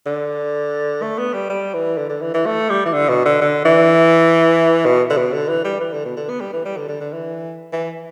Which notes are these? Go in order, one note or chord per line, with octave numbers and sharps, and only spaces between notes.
D3
A3
B3
G3
G3
E3
D3
D3
E3
E3
A3
G3
E3
D3
B2
D3
D3
E3
B2
D3
B2
D3
E3
G3
E3
D3
B2
D3
B3
G3
E3
G3
D3
D3
D3
E3
E3